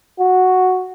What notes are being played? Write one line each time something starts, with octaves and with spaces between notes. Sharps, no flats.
F#4